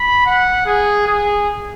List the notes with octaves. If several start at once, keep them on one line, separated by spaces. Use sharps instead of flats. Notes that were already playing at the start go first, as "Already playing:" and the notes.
Already playing: B5
F#5
G#4
G#4